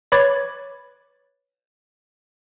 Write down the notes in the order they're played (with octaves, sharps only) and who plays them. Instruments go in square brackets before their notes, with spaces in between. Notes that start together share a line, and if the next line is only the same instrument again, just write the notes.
[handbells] B4 C#5 B5 D6 G#6 A6